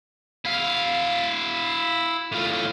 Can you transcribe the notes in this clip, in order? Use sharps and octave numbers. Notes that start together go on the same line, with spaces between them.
E4 F5
A2 F4